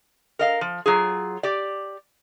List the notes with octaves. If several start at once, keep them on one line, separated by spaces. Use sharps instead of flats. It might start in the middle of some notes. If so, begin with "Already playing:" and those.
A#4 D#5 F5
F3
F#3 F4 G#4
G4 D5